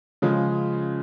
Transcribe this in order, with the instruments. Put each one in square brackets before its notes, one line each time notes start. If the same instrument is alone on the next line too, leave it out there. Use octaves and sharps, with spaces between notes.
[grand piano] C#3 F3 G#3